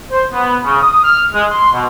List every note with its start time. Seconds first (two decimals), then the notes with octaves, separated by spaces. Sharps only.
0.12 C5
0.33 B3
0.64 C#3
0.82 D#6
1.04 F6
1.34 G#3
1.51 C6
1.73 B2